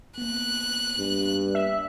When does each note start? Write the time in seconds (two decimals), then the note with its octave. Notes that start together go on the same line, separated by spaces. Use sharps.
0.18 A#3 B3 F#6
0.99 G2
1.55 E5